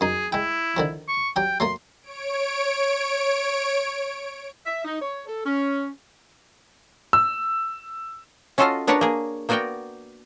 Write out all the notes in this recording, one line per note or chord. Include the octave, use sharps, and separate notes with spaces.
F#2 D#4 G#4
G#3 E4 G5
D3 D#3 F3
C#6
F#3 G4 G5
F#3 A3 A#3 C6
C#5 D7
E5
D#4
C#5
A4
C#4
E6
C#4 F4 F#4 A4 D#5 F5
B3 D4 A#4 B4 C#5 F#5
A#3 G#4
A#3 B3 F#4 A#4 D5 G5